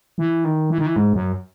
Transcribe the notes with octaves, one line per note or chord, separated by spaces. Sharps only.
E3
D#3
E3
D#3
E3
G#2
F#2